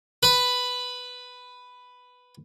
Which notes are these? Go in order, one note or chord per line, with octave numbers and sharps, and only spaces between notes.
B4 B5